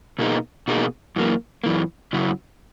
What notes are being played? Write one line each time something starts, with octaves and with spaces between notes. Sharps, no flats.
B2 A#3 D#4 G#4
B2 A#3 D#4 G#4
F#2 E3 A#3
F#2 E3 A#3
F#2 C#3 F#3 E4